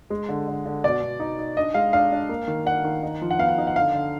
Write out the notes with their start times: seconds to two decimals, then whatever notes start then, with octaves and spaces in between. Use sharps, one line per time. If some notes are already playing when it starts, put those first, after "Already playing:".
0.10 G#3
0.29 D3
0.48 D3
0.66 D3
0.84 B2 D5
1.02 B2
1.20 D#4
1.39 D#4
1.57 D4 D#5
1.74 G#3 F5
1.93 D4 F5
2.12 D4
2.29 A#3
2.48 D#3
2.66 D4 F#5
2.84 D#3
3.03 D#4
3.22 F3
3.31 F#5
3.39 B3 F5
3.48 F#5
3.58 D#4
3.67 F#5
3.76 D3 F5
3.94 D3